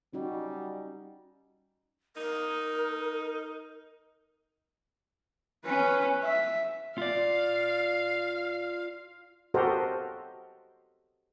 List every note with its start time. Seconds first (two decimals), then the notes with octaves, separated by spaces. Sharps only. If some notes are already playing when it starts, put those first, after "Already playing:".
0.13 G3 C#4 D#4 F#4
2.17 D#4 A#4
5.65 C#4 B4
6.24 E5
6.98 F4 D5 F5
9.54 F#4 G4 A4 A#4 C5 D#5